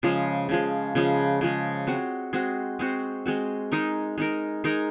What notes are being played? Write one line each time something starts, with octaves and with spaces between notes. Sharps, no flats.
C#3 F3 G#3
C#3 F3 G#3
C#3 F3 G#3
C#3 F3 G#3
G#3 C4 F#4
G#3 C4 F#4
G#3 C4 F#4
G#3 C4 F#4
G#3 D#4 A#4
G#3 D#4 A#4
G#3 D#4 A#4